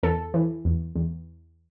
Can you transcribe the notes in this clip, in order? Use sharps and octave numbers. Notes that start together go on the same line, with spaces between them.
E2 A4
E3
E2
E2